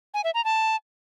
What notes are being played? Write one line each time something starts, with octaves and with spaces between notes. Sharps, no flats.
G#5
E5
A#5
A5